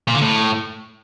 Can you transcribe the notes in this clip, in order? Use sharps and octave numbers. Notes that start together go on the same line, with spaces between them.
A#2
D3
A2